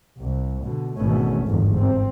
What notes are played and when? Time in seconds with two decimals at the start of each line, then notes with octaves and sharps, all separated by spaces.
0.19 C2
0.64 B2 D3
0.97 G#1 E2 B2 A3 C#4
1.46 G1 E2 G#2
1.76 C4